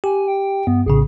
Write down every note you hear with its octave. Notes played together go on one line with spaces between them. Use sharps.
G4 G#5
G5
G2 B3
A#1 A2 C#3 G#4